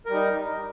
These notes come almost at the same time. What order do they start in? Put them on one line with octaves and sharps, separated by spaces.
A#4 G3 D#4